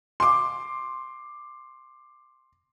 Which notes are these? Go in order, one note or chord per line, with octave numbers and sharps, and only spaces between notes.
C6 D6